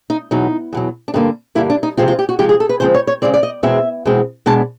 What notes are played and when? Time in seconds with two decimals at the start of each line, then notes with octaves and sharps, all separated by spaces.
0.10 D#4
0.31 E2 B2 F#3 D#4
0.73 E2 B2 F#3
1.08 D4
1.14 G2 D3 G3 A#3 D#4
1.55 G2 D3 G3 A#3 E4
1.70 D4
1.83 D#4
1.97 C3 F3 G#3 C4 F4
2.08 F4
2.19 G4
2.29 F#4
2.39 C3 F3 G#3 C4 G4
2.49 G#4
2.60 A4
2.69 B4
2.80 C#3 F3 G#3 C4 C5
2.94 C#5
3.07 C#5
3.22 C#3 F3 G#3 C4 D5
3.34 D5
3.43 D#5
3.63 E2 B2 G#3 C4 E5
4.06 E2 B2 G#3 C4
4.46 B2 G#3 B3 D4 A5